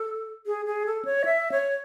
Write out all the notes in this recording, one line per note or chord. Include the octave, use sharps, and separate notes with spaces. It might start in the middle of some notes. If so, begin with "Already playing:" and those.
Already playing: A4
G#4
G#4
A4
C#5
E5
C#5